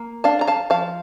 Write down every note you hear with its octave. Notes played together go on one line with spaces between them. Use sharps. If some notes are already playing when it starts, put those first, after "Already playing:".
Already playing: A#3
D4 F5 A5
A#5
F5 A5
F3 F5 A5